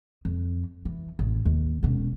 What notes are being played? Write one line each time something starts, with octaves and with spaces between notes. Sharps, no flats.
F2
E3
A1
D#2
E1 C#4